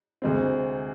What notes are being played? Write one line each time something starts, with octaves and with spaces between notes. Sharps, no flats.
D2 C3 G#3 C4